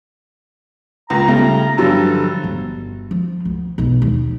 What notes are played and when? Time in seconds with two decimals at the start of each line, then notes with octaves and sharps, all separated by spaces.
1.10 C#2 A#2 A#5
1.28 C#3 G3 A3
1.78 G2 D3 F3 F#3 A4
2.44 G1
3.11 F3
3.45 D2
3.78 B1 E2
4.02 D#2